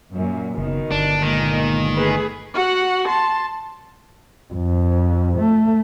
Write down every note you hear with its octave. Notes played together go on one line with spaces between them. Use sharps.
F#2 A#2
F#1 B2 D#3
G1 D4
A#2 D#3 G#3
A3 G#4 B4
F#4 F#5
A5 C6
F2
A3